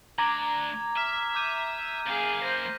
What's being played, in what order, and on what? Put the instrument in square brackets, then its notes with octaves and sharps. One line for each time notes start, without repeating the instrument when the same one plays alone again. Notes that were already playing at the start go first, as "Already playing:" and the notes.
[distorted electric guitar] D2 D4 [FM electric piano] A#5 [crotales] D6 G#6
[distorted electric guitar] E5 [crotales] F6 B6 E7
[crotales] D6 G6 D#7
[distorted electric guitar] F#2 A#3 [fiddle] G#4 F5
[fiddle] C5 [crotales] A#6